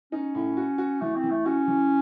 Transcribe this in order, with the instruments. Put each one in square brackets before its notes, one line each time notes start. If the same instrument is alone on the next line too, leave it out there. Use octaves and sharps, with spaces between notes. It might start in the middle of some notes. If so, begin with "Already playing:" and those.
[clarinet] C#4 [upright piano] D#4
[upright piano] A2
F#4
F#4
[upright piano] E3 [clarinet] A3
[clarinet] C4
[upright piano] E3
[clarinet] A3
[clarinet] C#4 [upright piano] F#4
[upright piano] E3